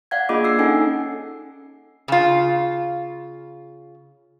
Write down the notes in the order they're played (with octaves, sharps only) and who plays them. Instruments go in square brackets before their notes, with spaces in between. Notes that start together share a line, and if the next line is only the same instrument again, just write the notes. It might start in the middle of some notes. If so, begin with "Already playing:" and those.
[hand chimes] D5 F5 F#5 G#6
A#3 D4 F4 G#4 D#5 D6
E6 C7
C#4 D#4 A4 F#5 G#5
[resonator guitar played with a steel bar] C#3 F4